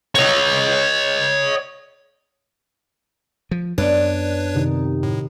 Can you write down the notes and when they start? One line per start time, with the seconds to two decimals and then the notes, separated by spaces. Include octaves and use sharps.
0.15 C#5 D#5
3.51 F3
3.78 F#2 B3 D4 B4 C#5 D5
4.55 C3 D#3 D#4
5.03 A2